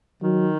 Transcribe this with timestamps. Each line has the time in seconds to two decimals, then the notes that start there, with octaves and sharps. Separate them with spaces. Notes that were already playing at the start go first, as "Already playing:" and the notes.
0.22 D#3 F#3